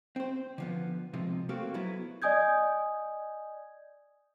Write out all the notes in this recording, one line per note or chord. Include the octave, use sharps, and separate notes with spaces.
C4 C5
D3 F3 B3
C3 F3 G#3
A3 A#3 C4 F#4 G4 F5
F#3 B3 E4
D5 D#5 G#5 D#6 G6 G#6